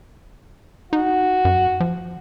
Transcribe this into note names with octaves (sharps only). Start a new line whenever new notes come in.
D#4 F#4
F#2
F3